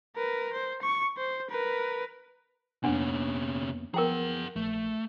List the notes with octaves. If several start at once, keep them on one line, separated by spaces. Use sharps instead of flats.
A#4 B4
C5
C#6
C5
A#4 B4
F2 C3 A#3 B3 C#4 D4 F#5
F3 B3 G#4 A#4 F#5 G5 A#5
A#1 A3